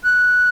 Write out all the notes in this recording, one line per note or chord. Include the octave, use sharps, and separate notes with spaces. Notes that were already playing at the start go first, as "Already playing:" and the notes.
F#6